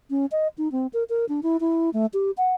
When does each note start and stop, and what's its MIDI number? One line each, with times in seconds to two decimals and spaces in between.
0.10 0.26 61
0.32 0.48 75
0.58 0.71 63
0.72 0.87 60
0.94 1.04 70
1.09 1.25 70
1.29 1.40 62
1.43 1.57 64
1.60 1.90 64
1.93 2.06 57
2.14 2.31 67
2.38 2.55 78